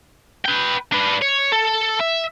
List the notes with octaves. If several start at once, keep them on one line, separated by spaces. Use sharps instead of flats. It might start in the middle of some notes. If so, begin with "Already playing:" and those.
B4 G5
D4 B4
C#5
A4
E5